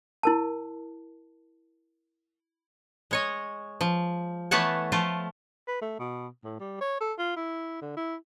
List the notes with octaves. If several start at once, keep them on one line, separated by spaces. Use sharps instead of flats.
E4 A#4 A5
G#3 C#5 D#5
F3
E3 A3 B3 C#5 F#5 A5
F3 A3 F4
B4
A3
B2
A2
G3
C#5
A4
F4
E4
D3
E4